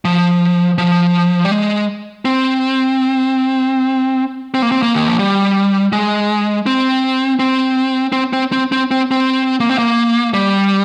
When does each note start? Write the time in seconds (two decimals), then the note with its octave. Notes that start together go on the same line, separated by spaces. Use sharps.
0.05 F3
0.78 F3
1.45 G3
1.52 G#3
2.25 C4
4.54 C4
4.62 A#3
4.72 C4
4.82 A#3
4.95 D#3
5.07 F3
5.19 G3
5.92 G#3
6.66 C4
7.39 C4
8.12 C4
8.33 C4
8.52 C4
8.72 C4
8.91 C4
9.11 C4
9.60 A#3
9.69 C4
9.78 A#3
10.34 G3